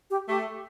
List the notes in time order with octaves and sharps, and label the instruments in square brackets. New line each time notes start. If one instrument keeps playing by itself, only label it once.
[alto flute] G4
[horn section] A3 [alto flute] G4